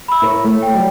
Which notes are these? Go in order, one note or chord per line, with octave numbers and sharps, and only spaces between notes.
B5 E6
E4 A#4 C#5
A3
G5
F#3 G3